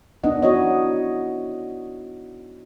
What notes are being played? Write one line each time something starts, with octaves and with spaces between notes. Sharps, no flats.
B3 D4 D#4 D#5 F#5
E4 F#4 C#5 D#5